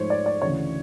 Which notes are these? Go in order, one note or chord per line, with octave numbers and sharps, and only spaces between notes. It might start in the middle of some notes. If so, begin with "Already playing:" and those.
Already playing: G#2 F3 A3 C5 C#5
D5
D5
D2 C#3 E3 C#5